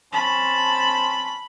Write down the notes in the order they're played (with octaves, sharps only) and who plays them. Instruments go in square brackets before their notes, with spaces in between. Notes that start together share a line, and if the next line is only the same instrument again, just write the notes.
[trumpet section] C4 C#4 A5 [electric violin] B5